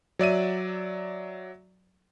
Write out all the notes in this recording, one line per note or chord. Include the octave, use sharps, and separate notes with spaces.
F#3 D5 E5 D#7